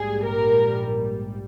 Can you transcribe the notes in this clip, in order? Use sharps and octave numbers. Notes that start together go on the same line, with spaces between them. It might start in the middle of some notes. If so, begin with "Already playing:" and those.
Already playing: A#1 G#2 G3 G#4
A#4